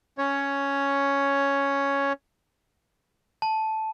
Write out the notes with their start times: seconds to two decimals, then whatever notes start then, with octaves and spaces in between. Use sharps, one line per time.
0.18 C#4 C#5
3.42 A5